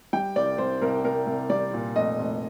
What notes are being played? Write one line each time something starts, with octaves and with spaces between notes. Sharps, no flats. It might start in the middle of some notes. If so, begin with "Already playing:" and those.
G3 G5
C2 D5
C2 C5
C2 A#4
C2 A#4
C2
G3 D5
A#2
F1 D#5
F1